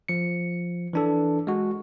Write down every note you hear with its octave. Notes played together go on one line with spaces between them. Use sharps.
F3 C#7
E3 D4 A4
G#3 F#4